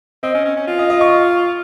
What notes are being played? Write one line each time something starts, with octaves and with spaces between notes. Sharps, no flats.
C4 D#5
C#4
C#4
C#4
F4
D#5
D#5
C#6